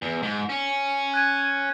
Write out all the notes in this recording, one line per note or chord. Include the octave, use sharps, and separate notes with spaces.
E2
G#2
C#4
F#6 G#6 D#7